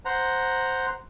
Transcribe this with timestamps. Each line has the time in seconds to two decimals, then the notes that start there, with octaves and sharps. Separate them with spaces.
0.05 C5 F#5 A#5